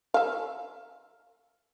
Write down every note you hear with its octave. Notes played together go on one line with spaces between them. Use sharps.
E5 F5